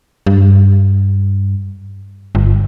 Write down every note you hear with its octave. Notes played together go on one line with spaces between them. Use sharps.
G2
G1